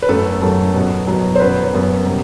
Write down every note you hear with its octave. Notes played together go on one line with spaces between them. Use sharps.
B4
F#2 F#3 A3 A4
F#2 F#3 A3
B2 F#3 B3
B2 F#3 B3
C5
F#2 F#3 B3 B4
F#2 F#3 B3
C3 G3 B3